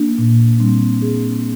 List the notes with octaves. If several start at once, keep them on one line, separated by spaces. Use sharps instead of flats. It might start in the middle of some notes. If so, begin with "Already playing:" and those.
Already playing: A#3 D4
A#2
D4
G3 C4
G#4